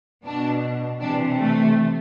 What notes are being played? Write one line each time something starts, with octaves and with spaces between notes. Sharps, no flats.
B2 D4
C3 E3 D4
A3